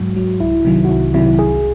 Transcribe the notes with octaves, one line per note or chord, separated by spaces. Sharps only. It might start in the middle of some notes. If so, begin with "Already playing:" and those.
Already playing: G#2 F#3 F#4
F#3
C2 E4
C3 D#3 F#3
F#4
C2 E4
C3 D#3 F#3 E4
C2 G#4